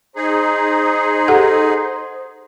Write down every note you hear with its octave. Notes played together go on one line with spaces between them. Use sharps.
D#4 G#4 C5
G4 A4 F#5